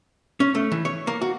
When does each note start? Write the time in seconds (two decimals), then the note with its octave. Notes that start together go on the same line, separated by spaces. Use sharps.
0.40 C#4
0.55 A3
0.72 E3
0.85 C#5
1.07 A#3
1.21 F#4